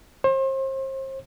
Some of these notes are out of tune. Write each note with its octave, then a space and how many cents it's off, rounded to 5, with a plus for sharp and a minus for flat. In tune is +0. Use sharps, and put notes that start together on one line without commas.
C5 +35